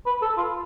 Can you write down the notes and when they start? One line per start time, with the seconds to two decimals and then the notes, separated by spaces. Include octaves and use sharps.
0.06 B4
0.22 A4
0.37 F4